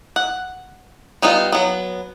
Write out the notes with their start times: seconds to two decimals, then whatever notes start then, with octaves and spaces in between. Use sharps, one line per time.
0.16 F#5
1.22 G3 B3 D#4 F4
1.52 F#3 B3